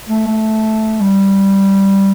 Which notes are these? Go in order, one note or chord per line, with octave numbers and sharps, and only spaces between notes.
A3
A3
G3